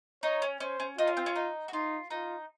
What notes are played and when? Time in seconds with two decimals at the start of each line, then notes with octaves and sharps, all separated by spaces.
0.23 D#4 C#5
0.42 C#4
0.60 C#4 C5
0.80 C#4
0.98 D#4 F4
1.07 C#4
1.17 C4
1.26 C#4
1.36 D#4
1.68 F#4
1.73 D#4 F4
2.10 D#4 F4